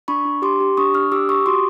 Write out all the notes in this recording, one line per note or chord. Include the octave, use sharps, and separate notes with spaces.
D4 B5 C#6
D4
G4 C6 D6
G4
D4 C#6 D#6
D4 D#6 F6
G4 D6 E6
G4 C#6 D#6
F#4 C6 D6